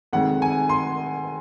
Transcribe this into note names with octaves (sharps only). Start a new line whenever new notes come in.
F2 D#3 G#3 F#5
G#5
C6